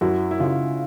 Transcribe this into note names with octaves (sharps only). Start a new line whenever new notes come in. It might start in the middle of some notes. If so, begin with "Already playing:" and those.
F#2 E4 F#4
E4
C#3 D#4 F4